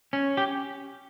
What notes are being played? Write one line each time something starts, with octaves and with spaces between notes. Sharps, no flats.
C#4
G4